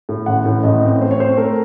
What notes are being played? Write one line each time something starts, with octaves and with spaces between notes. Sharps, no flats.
A2
A1 F#5
A2
A1 D#5
C4
A3 C5
C#5
C4 C5
A3 A#4